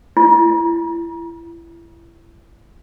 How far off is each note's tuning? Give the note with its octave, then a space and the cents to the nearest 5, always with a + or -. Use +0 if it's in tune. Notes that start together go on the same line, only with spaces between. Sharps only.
E4 +30